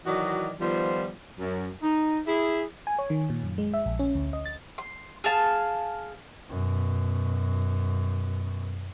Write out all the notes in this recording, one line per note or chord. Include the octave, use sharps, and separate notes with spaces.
D#3 E3 F#3 F#4 D5 D#5
D#3 F3 G3 B3 F4 C5
F#2
D#4
E4 G#4
G#5
C#5
D#3
A#2
F#2
G#3
E5
A#1
C#4
D2
D#5
A6
C6
G#4 F5 A5
F#2 B2